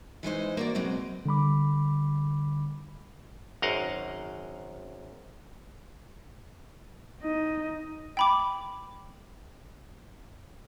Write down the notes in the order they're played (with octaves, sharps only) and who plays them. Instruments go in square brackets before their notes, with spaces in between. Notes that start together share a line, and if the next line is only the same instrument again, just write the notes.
[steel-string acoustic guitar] E3 G#3 D#4 C5
A#3 F#4 D5
B2 F#3 G#3 C4
[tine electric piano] D3 G3 B5 D6
[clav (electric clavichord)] G#1 F#2 A#4 D#5 F5 F#5
[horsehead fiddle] D#4 D#5
[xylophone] G5 B5 D6